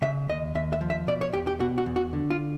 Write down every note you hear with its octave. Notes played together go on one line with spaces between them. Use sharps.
C#3 E5
D#2 D#5
D#2 E5
E5
F3
E5
B2 D5
C#5
E2 G4
G4
B2 F#4
F#4
E2
F#4
D3
F4